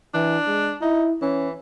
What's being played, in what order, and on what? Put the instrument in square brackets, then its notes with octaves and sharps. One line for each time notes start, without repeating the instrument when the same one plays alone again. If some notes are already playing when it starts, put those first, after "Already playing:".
[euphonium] E3 [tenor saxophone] D4
[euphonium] G#3
[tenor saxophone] D#4 [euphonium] E4
[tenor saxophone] E3 [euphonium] C#4